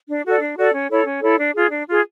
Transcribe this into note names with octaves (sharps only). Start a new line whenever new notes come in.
D4
F#4 A4 D5
D4
F#4 A4 D5
C#4
E4 A4 C#5
C#4
E4 A4 C#5
D4
F4 G#4
D4
F4 G#4